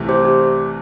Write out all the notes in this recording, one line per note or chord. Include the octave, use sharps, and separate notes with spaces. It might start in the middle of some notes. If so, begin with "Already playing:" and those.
Already playing: C2 C3 E3 A3
G4 C5
G4